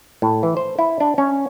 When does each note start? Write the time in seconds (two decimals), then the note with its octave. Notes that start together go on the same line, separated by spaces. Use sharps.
0.22 A2
0.43 E3
0.57 C5
0.79 E4
1.00 D4
1.18 C#4